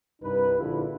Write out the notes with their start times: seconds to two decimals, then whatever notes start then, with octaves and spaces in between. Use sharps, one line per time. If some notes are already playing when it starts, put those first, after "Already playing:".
0.22 C2 G2 D#4 B4
0.58 A#1 D3 E4 F4 B4